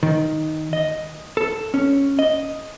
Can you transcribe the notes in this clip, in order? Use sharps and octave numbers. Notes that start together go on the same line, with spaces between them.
D#3
D#5
A4
C#4
D#5